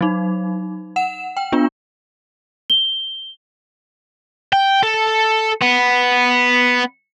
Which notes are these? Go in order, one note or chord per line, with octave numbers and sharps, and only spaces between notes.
F#3 D#4
F#5 E7
G5
B3 D4 F4
G7
G5
A4
B3